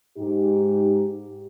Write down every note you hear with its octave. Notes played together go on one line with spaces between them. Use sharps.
G#2 D#4 G4